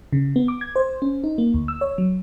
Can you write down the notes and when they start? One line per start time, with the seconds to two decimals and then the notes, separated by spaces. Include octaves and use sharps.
0.13 C#3
0.36 B3
0.48 D6
0.61 G#6
0.76 C5
1.02 C#4
1.24 D#4
1.38 A#3
1.54 D2
1.68 E6
1.81 C#5
1.98 F#3